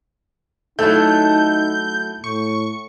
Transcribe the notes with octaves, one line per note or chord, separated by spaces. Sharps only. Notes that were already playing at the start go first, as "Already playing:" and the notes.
F#3 A3 D#4 E4 A4 G6
A2 C#6